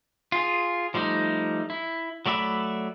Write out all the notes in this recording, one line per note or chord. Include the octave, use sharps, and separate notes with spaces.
F4 G#4
F3 G3 A3 D#4
E4
F#3 A3 D5 E5 B5